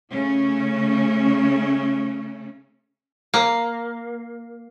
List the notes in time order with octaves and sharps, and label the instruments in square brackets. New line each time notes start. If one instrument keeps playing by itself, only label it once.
[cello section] C#3 A3 C#4
[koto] A#3